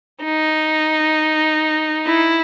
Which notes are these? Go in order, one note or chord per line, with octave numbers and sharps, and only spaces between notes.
D#4
E4